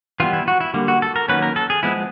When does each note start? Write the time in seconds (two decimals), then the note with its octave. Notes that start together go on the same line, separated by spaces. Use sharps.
0.20 E3 G3 B3 F4
0.33 E4
0.48 F#4
0.61 E4
0.74 D3 G3 A#3
0.88 F#4
1.02 A4
1.16 A#4
1.28 D#3 F#3 A#3 C#4 B4
1.42 A#4
1.56 A4
1.70 G#4
1.83 F3 G#3 B3 E4